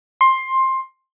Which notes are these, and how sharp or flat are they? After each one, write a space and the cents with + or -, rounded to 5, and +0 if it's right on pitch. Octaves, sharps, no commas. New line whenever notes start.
C6 +15